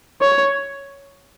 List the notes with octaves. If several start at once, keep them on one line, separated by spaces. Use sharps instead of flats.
C#5